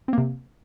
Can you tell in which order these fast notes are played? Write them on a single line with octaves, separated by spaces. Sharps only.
C4 A#3 C3